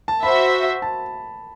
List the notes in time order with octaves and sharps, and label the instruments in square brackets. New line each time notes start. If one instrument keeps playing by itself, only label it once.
[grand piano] A5
[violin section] F#4 C5 E5 [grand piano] B5
[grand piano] A5